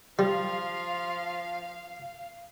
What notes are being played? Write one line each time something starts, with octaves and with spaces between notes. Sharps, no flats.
F3 G3 F5